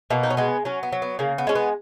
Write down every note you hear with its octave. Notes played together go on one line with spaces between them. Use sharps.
B2 A#3
D#4
C#4
G#3 B3
F#3 C#4
B3
F#3
B3
C#3 A#3
B3
G#3 C#4
B3